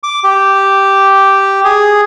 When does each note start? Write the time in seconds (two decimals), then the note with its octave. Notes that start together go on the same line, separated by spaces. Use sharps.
0.03 D6
0.24 G4
1.64 G#4